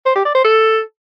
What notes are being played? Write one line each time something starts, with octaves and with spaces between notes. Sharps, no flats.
C5
G4
D5
C5
A4